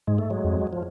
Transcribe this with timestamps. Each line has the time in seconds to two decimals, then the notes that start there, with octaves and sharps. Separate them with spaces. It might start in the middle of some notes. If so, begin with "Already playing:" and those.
0.07 G#2 G#3
0.18 A3
0.31 F#3 G#3
0.44 F2
0.73 F3